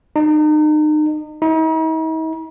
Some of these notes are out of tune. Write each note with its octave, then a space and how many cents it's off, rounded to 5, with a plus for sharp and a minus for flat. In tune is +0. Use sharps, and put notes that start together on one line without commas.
D#4 -35
D#4 +45